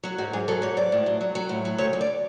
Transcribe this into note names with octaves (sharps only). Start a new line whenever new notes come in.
F#3 F#4
G#2 F#4
G#2 G#4
F#3 A4
G#2 C#5
G#2 D5
A2
F#3
F#3
F#3
A2
F#3
D2 C#5
D2
D5